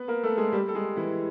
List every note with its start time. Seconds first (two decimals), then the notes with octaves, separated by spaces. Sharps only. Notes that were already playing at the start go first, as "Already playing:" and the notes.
Already playing: B3 B4
0.08 A#3 A#4
0.23 A3 A4
0.37 G#3 G#4
0.52 G3 G4
0.68 A4
0.75 G#3 G#4
0.96 E3 E4